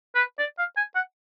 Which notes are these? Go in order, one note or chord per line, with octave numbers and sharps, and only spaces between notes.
B4
D5
F5
G#5
F#5